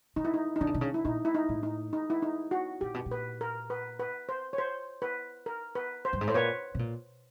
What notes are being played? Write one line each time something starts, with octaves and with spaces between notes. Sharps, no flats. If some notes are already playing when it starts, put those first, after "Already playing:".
C#3 D#4
E4
D#4
D#4
D3 D4
C#3
C3
C#3
E4
A#2 D#4
E4
D#4
A2
D#4
D#4
E4
D#4
F#4
A#2 G4
B2
A#2
B4
A#4
B4
B4
C5
C#5
C5
B4
A#4
B4
C5
G2
G#2
A2 C5
A#2 B4 C#5
B2
A#2